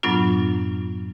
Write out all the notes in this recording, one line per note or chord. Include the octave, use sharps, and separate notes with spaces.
F#2 A2 F#3 B3 D4 F4